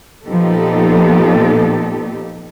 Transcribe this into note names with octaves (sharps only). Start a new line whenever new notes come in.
A#2 F3 B3 D#4 G4 A4